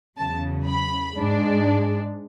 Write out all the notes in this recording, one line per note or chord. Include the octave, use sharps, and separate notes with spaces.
E2 C#3 F#3 A5
B5
G#2 G#3 D4